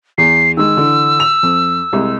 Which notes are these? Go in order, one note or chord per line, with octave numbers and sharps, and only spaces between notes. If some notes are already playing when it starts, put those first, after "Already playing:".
E2 C7
D#3 G#3 E6
D3 E3
F7
F2
C2 G#3